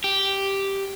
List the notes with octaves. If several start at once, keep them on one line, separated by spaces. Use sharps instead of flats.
G4